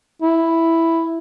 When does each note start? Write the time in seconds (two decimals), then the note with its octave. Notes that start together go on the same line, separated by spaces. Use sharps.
0.22 E4